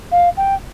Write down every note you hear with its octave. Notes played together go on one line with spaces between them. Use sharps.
F5
G5